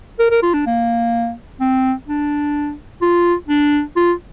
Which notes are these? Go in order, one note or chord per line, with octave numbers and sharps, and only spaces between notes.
A#4
A#4
F4
D4
A#3
C4
D4
F4
D4
F4